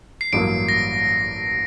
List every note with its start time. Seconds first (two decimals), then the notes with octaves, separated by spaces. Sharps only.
0.21 C7
0.33 A1 G2 F#3 A#3 D7
0.69 A#6